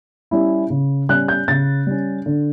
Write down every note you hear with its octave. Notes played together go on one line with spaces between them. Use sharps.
G3 C#4 E4
C#3
G3 C#4 F#6
G6
C#3 A6
G3 C#4
D3